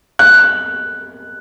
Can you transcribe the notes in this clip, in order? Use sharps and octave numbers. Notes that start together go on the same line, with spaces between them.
F#6